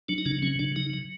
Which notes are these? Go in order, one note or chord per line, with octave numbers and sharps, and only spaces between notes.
F#3 D4
D#4
C#3 D4
F#3 C#4
C#3 D4
F#3 D#4
F#3